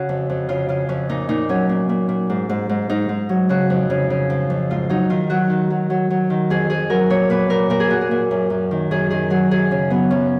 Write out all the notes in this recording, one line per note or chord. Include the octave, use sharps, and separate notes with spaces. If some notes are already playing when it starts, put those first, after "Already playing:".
Already playing: C#3 F#4
F2
F2
C#3 F4
C#3 F4
F2 C#4
A#2 D#4
A#2 D#4
F#3 C#4
A#2
A#2
A#2
G#2
G#2
G#2
G#2 D#4
G#2
F#3
C#3 F#4
F2
C#3
C#3
F3
F2
G#2 F4
F#3 D#4
D#3 F4
F#3 F#4
D#3
F#3
F#3
F#3
D#3
F2 G#4
F2 G#4
F#3 A#4
A#2 C#5
A#2 B4
A#2 A#4
A#2 A#4
G#4
A#2 F#4
G#4
A#2
F#2
F#2
D#3
F#2 G#4
D#3 G#4
F#3 G#4
F#2 G#4
C#3 C#4
F#3 B3
F#2 C#4